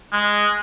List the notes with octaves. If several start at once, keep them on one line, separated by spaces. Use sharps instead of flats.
G#3